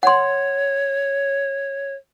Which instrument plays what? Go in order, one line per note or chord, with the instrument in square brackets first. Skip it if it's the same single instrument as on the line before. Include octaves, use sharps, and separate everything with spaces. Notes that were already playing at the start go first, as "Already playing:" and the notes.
[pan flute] C#5 [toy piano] F#5 C6